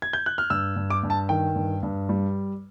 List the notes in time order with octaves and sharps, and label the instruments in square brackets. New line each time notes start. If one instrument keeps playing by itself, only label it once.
[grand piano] G#6
G6
F#6
F6
G2 E6
G2
D6
G2
A5
D#3 G5
G2
G2
G3